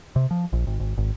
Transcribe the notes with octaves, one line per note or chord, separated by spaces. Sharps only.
C3
F3
A#1
G#1
G#1
G#1